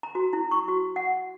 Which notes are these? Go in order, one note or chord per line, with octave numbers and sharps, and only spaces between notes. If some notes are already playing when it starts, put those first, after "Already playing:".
A#5
F#4
E4
C#6
F#4
F#5